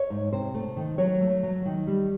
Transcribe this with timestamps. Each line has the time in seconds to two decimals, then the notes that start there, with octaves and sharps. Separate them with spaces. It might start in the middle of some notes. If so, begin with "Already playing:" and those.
Already playing: C#5
0.10 G#2
0.33 C3 C5
0.54 A3
0.77 D#3
0.98 F#3 C#5
1.21 A3
1.43 F#3
1.65 D#3
1.87 G3